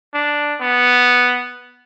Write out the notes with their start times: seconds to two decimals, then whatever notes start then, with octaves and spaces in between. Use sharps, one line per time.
0.14 D4
0.61 B3